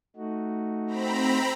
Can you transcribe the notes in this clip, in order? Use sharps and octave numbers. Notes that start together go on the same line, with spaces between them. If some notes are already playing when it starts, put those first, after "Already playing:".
A3 D#4 F#4
C4 A#5 B5